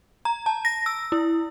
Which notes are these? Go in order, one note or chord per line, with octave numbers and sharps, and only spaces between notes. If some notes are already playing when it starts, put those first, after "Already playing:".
A#5
A5
A#6
E6
E4